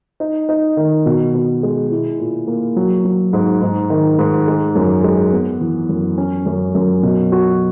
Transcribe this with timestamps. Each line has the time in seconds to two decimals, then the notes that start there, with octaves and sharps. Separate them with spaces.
0.20 D#4
0.49 D#4
0.77 D#3
1.06 B2
1.34 B2
1.63 G#3
1.91 E4
2.20 A#2
2.47 A#3
2.77 F#3
3.05 F#3
3.33 G#2
3.62 G#2
3.90 D#3
4.19 G#2
4.48 G#3
4.75 F#2
5.04 G#3
5.32 B3
5.61 E3
5.89 F#2
6.18 C#4
6.46 F#2
6.75 F#2
7.03 B2
7.32 F#4